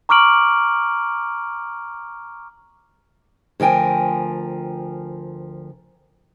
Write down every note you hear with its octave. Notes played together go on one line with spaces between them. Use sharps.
A#5 C#6 D6 F6 D7 F#7
D2 F3 A#4 G5 G#5